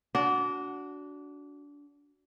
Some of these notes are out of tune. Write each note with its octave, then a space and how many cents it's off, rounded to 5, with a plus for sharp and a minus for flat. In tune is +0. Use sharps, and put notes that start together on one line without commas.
D4 -25 F#4 +0